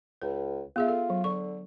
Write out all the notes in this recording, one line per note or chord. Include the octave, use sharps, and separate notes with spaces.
C#2 B4
B3 F4 G#4 E5
A4
F#3
D3 C#6